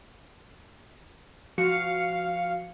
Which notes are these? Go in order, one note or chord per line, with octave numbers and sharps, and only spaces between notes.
F3 F#4 F5 C#7